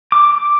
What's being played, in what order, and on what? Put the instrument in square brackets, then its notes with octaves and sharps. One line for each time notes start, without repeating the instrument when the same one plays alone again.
[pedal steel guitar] D6